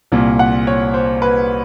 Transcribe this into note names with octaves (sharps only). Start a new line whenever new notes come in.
C2 A#2
F#5
C#5
C5
B4